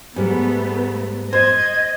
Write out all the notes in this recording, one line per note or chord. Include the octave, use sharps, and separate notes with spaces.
G#2 G3 A3 B3
C5 D#5 G#6